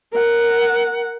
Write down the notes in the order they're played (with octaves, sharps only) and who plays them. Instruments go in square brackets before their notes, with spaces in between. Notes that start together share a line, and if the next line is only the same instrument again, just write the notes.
[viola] A#4 F#5